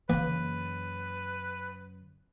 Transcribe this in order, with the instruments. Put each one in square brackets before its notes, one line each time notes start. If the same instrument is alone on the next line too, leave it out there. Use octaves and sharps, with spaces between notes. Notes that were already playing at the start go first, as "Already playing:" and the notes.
[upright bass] F#2 C#3 [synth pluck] E3 A#3 [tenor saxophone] B4